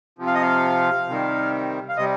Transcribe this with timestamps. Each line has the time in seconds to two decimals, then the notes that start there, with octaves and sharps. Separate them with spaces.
0.19 C3 F3
0.27 F5
0.35 D#5
0.42 F5
1.08 C3 D#3 G3
1.89 F5
1.97 C3 G3 D#5